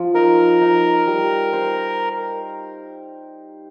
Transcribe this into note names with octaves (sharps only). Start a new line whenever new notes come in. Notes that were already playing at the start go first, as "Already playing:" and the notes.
Already playing: F3
D#4 A#4
D#4
G3
C5